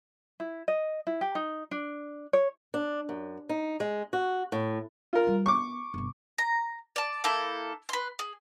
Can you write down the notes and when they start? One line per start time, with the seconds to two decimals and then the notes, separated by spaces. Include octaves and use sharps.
0.40 E4
0.68 D#5
1.07 E4
1.21 G4
1.35 D#4
1.71 D4
2.33 C#5
2.74 D4
3.09 F#2
3.49 D#4
3.80 G#3
4.13 F#4
4.52 A2
5.13 F4 A#4
5.27 G3
5.46 B3 C#6 D6
5.94 G1 C3
6.38 A#5
6.96 D5 A5
7.24 A#3 E4 A4 G6
7.89 B4 C6
8.19 G#4